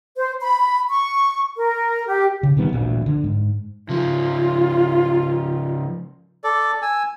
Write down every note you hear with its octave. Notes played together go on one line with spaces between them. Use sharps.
C5
B5
C#6
A#4
G4
C#3
C3 D#3 G3 B3
A1 D2 A#2
D3
G#2
C#3 F3 F4
A4 D5
G#5 E6